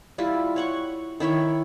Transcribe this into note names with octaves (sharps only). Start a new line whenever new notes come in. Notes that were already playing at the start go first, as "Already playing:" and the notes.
G3 E4 F4
C#5 F#5 C#6
D#3 E4 C#5 G5